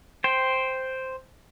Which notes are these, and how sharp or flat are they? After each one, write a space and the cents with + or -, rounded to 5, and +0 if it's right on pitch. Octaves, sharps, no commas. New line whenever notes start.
C5 +0 G5 +0